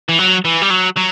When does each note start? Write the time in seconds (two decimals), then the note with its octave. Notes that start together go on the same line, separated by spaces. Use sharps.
0.09 E3
0.19 F#3
0.45 E3
0.62 G3
0.70 F#3
0.96 F#3